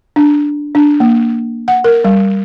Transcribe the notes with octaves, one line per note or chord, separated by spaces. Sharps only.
D4
D4
A#3
F#5
A#4
G3